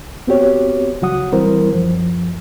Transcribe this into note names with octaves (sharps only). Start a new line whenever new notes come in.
B3 C4 F#4 G4 C#5
C#2 F#3 F#4 F#5 D#6
E3 G3 C4 E4 A#4 C5
F#2 F3